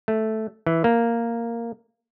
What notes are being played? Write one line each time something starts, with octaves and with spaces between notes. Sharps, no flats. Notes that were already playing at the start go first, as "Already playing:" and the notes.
A3
E3
A#3